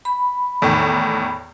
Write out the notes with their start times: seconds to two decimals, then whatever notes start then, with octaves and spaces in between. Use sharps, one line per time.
0.05 B5
0.62 E2 A2 D#3